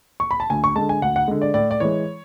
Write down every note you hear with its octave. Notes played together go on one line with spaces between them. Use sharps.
C#6
B5
A5
D2 G#5
C#6
D3 G#3 A5
G#5
D2 F#5
F#5
D3 G#3
D5
A2 D5
D5
E3 G#3 C#5